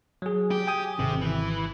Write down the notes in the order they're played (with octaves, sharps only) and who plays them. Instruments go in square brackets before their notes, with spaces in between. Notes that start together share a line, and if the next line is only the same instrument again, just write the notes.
[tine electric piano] F#3 G#4
[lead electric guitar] G4
[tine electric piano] G5 G#5 D#6
[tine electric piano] G#1 [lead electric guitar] C3
[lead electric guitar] E3